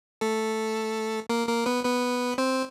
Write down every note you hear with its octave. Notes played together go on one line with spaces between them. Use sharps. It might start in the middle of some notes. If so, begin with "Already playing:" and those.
A3 A4
A#3 A#4
A#3 A#4
B3 B4
B3 B4
C4 C5